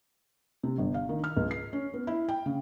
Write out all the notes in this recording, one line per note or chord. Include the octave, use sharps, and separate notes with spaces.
C3
G1
F5
D#3
F6
C#2
C7
C#4
B3
E4
G5
C#3